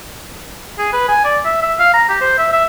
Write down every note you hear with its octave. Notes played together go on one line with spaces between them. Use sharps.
G#4
B4
G#5
D5
E5
E5
F5
A#5
G4
C5
E5
E5